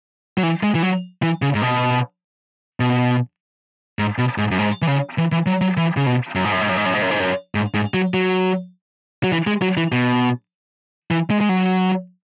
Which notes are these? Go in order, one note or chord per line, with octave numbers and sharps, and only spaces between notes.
F#3
E3
G#3
E3
F#3
E3
C#3
G#2
B2
B2
G#2
B2
G#2
F#2
G#2
E3
C#3
E3
E3
F#3
F#3
E3
C#3
B2
F#2
G#2
F#2
G#2
F#2
G#2
F#2
G#2
F#2
G#2
F#2
G#2
G#2
F#3
F#3
F#3
E3
G#3
F#3
E3
B2
E3
G#3
G#3
F#3